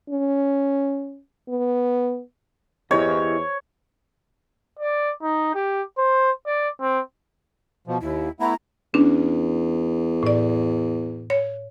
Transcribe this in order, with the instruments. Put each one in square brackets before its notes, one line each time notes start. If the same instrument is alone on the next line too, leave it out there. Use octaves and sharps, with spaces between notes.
[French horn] C#4
B3
[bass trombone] E2 [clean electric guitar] E4 G4 D#5 [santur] C#5
[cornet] D5
D#4
G4
C5
D5
C4
[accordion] B2 F3
[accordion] D#2 [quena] E4
[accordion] A3 B3 E4 [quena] A#5
[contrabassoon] E2 [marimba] C#4 D4
[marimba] A2 D5
C#5